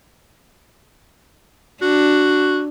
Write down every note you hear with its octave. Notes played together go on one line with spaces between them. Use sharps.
D4 F#4